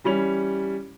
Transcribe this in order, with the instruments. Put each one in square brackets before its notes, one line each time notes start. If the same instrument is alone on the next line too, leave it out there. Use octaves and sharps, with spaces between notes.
[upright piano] E3 G3 C#4 F7